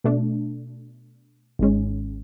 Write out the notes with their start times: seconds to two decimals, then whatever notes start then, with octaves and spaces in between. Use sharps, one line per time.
0.04 B2 A3 D4
1.59 G#1 G#2 G#3 C#4